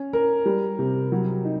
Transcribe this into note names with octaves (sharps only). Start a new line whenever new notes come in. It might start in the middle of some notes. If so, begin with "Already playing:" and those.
Already playing: C#4
A#4
G3
C3
F#3
D#4